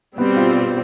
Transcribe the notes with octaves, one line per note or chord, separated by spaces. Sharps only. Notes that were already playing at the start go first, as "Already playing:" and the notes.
B2 G3 B3 C4
F4